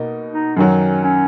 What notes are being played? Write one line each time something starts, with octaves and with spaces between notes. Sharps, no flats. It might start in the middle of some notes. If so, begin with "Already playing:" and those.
Already playing: B2 A#3 D#4
D#4
F#2 D#3 F#3 C#4
C#4